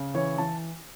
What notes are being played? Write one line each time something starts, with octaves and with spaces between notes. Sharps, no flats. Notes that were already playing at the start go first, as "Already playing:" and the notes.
Already playing: C#3
E3 C#5
E3 A5